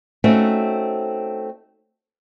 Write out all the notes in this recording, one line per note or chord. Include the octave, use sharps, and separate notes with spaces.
A3 C4 C#4 D#4 F#4